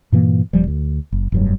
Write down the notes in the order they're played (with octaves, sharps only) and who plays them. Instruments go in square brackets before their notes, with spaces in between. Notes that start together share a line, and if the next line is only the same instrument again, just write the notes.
[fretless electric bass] G2 A#2 E3 A#3
D#1 F3 G3
D2
F#1
F1 G2 F#3